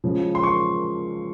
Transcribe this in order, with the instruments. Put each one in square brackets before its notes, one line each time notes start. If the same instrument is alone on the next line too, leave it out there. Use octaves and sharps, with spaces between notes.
[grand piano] C#3 F3 G#3
C6
C#6